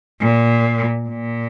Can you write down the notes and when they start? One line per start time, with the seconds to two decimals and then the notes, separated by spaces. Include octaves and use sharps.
0.20 A#2
1.09 A#2